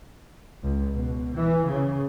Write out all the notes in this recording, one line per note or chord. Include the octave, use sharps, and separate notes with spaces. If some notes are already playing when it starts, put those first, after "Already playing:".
C#2
B2
E3
C#3